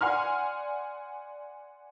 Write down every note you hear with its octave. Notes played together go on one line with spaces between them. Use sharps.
D5 F#5 G#5 C6 F6